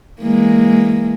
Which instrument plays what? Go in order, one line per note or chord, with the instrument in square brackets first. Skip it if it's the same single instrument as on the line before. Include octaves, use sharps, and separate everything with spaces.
[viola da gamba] E3 G#3 [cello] A#3